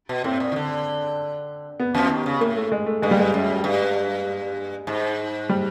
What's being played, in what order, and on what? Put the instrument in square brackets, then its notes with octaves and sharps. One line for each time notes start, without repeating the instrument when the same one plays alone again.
[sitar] B2
[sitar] A2 [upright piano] C4
[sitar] A#2
D#3
D3
[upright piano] B3
[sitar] F2 F3
D#2 D#3
C#3
[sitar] A2 [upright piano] A#3
[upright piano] A3
G#3
A3
[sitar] G2 [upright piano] G#3
[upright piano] G3
G#3
[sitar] F#2
G2
G#2
[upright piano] G3